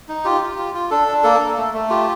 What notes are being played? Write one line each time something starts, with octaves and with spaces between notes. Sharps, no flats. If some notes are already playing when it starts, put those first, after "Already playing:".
D#4
F4 G4
F4
F4
F4
D4 A4
D4
A#3 A4
A#3
A3
A3
F4 G4